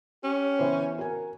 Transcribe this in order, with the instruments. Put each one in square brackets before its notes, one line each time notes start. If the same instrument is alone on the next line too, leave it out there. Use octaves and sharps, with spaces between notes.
[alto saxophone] C#4 [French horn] G4
[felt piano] E3 B3 C5
[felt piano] F#4 G#5 [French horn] A#4